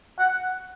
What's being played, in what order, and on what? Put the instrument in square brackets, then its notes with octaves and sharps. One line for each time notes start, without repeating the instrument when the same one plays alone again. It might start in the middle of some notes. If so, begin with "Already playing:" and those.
[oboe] F#5